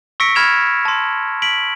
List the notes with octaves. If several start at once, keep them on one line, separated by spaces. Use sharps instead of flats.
C#6 E6 A#6 B6 C#7 D7
B5 F6 G#6 E7 F7
A5 C6
B6 D7 F#7